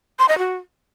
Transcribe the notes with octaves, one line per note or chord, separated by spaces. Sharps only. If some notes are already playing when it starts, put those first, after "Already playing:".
C6
D#5
F#4